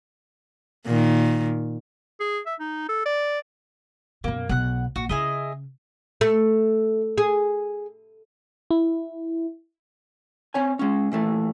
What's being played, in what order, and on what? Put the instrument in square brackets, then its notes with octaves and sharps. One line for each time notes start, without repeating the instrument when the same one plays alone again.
[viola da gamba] A#2 D#3
[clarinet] G#4
E5
D#4
A4
D5
[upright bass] F#2 B2 [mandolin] A#3
[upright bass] B1 B2 [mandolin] F#5 F#6
[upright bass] A#1 [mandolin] F#4
[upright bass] C#3 C#4 [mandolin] E4 G#4 D#5
[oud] A3
G#4
[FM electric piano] E4
[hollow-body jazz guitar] C4 C#5 G#5
G#3 C#4
A#2 E3 A3